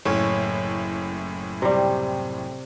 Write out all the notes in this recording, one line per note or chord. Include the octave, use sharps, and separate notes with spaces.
F#1 A2 C#4
C3 G3